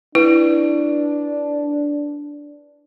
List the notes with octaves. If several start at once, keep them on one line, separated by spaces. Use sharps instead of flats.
D4 E4 B4